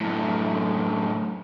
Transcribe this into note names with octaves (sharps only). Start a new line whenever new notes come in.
F#2 A2